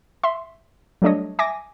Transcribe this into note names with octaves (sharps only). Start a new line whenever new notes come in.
E5 C6
F#3 G3 A3 D4 C#5 D#5
E5 G#5 D6 A#6